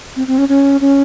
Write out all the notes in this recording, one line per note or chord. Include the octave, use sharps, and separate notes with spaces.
C4
C4
C#4
C#4
C#4